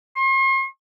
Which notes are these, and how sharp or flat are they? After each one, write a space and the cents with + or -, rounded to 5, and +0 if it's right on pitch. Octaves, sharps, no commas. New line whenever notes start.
C6 +45